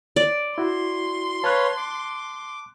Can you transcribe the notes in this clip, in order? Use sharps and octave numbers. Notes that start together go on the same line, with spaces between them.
D5
E4 F#4 C6
B4 C#5 F5 A5 F#6
D6